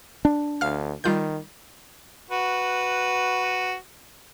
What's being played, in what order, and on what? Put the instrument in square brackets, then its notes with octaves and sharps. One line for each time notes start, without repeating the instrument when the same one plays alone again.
[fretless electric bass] D4
[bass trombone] D2 [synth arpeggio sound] F5 F6
[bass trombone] D#3 [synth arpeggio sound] G3 F4 G6
[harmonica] F#4 B4